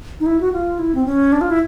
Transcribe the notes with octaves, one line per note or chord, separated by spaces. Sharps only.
D#4
E4
F#4
F4
E4
C4
C#4
D4
F4
E4